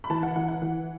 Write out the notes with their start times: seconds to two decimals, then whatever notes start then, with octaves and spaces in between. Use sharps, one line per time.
0.04 B5
0.10 E3 A5
0.23 F#5
0.36 E3 F#5
0.48 F#5
0.62 E3